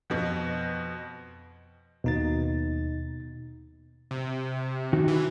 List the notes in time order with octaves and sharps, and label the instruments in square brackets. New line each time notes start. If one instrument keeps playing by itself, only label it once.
[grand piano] F2 B2
[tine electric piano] D#2 D#4 A6 [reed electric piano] B2
[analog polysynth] C3
[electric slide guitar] D#3 D#4 F#4
[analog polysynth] E3